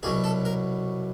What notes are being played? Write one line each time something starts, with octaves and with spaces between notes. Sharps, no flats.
C2 B2 F#3 G#4
A4
A#4